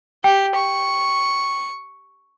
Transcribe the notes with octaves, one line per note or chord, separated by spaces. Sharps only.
G4 G5
C#6